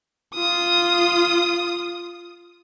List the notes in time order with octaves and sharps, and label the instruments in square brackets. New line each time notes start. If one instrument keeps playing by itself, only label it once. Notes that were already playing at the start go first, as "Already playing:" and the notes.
[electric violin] F4 D#6